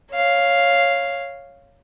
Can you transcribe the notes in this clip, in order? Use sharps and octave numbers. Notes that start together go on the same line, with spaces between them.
C#5 F5